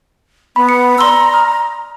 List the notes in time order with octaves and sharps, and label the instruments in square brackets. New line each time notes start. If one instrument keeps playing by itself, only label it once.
[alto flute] B3 [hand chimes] B5
[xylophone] C#7
[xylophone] D5 C6 E6 [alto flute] A#5
[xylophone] D#6 F6